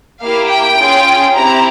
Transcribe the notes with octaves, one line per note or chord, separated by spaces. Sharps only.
A#3 E4 G4 F5
G5
C#4 F4 G#4
C4 E4 G4 A#5